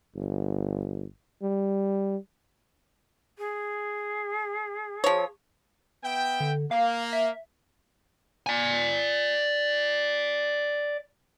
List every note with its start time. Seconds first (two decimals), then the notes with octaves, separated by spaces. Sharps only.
0.15 G1
1.43 G3
3.38 G#4
5.04 F3 C#5
6.04 B3 E5 G5
6.40 D3
6.71 A#3 F5
7.13 E5
8.47 D5 G#5